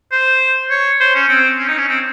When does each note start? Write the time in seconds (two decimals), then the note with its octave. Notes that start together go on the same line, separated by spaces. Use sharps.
0.12 C5
0.70 C#5
1.00 C5
1.15 C#4
1.29 C4
1.58 C#4
1.68 D#4
1.78 C#4
1.89 C4